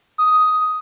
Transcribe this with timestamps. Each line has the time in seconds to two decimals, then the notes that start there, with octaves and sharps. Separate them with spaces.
0.18 D#6